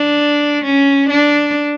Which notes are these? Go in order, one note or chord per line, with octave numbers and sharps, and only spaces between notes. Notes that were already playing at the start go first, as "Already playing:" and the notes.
Already playing: D4
C#4
D4